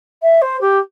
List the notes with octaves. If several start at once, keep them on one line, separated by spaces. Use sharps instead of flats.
E5
C5
G4